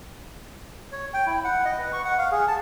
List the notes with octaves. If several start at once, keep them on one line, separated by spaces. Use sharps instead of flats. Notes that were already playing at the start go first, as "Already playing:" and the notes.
C#5
G5
E4
F#5
D#5
B4
C#6
F#5
F5
G#4
A5